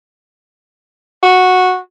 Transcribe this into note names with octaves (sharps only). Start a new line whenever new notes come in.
F#4